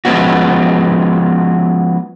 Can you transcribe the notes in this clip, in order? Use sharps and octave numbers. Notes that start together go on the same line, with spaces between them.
F3 G#3 A#3 B3 C#4 F#4